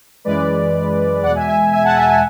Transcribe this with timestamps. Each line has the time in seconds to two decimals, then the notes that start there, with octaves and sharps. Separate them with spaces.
0.25 F#2 E3 G#3 B4 D5
1.23 E2 B2 G#3 D5 F#5
1.35 E5 G#5
1.48 E5 G#5
1.72 E5 G#5
1.84 F#5 A5
1.96 E5 G#5
2.09 E5 G#5